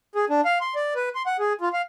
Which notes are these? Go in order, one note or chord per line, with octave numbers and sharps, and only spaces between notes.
G#4
D4
F5
C6
D5
B4
C6
F#5
G#4
F4
F5